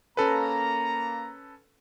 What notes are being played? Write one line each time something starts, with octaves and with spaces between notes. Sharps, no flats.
A#3 C#4 A4 B4 A#5